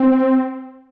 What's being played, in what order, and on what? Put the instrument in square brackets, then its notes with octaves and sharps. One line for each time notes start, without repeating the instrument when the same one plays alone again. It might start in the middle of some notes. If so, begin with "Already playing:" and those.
Already playing: [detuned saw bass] C4